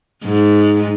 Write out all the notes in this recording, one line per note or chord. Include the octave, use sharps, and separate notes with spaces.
G#2